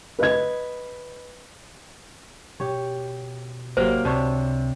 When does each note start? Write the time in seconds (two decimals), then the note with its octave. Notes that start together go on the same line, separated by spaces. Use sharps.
0.19 B4 D#5 G#6
2.60 B2 G4 C#5
3.77 G#1 C3 F#3 A#3 C5
4.05 C#2 C3 D4 C#5